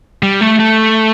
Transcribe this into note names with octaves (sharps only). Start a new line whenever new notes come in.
G3
A3
A3